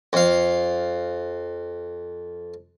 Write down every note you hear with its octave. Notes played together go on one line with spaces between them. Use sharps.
F2 F5